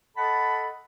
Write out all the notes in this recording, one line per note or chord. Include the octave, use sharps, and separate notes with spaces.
A4 D#5 F#5 A5 B5